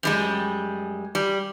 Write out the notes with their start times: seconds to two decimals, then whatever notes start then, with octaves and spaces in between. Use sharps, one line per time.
0.03 F#2 G3 G#3
1.15 G3